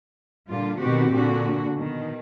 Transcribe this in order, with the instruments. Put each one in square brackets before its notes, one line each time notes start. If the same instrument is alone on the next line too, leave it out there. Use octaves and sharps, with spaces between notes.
[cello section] A#2 D3 G3 F4
B2 D#3 C4 F#4 G4
A#2 D3 F#4
B2 D#3